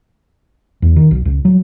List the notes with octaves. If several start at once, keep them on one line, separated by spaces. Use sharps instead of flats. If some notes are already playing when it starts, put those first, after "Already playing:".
E2
D#3
B1
C#2
F#3